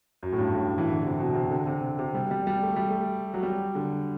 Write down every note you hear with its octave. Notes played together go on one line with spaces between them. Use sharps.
F#2
A2
G2
A2
E3
D3
C3
B2
C3
D3
C3
C3
G3
G3
G3
A3
G3
A3
F#3
G3
D3